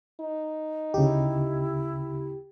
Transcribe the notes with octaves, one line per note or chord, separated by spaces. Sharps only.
D#4
D2 C#3 E4 G4